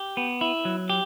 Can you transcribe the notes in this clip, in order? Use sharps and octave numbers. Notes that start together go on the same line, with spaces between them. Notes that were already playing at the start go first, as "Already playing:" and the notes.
Already playing: G4
B3
E4
F#3
G4